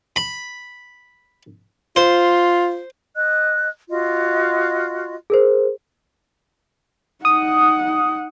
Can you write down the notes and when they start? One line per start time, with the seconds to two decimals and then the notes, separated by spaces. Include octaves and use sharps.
0.16 B5
1.96 F4 C5
3.17 D#5 F#6
3.90 F4 F#4 D#5
5.30 G#4 A#4 C5
7.25 D#4 F#5 D#6